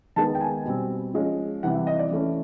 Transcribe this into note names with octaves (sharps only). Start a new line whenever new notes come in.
D#3 G#3 B3 A5
G5
G#5
B2 G3 C4
F3 G#3 C#4
C3 E3 G3 F#5
E5
D#5
D5
E3 A3 C#4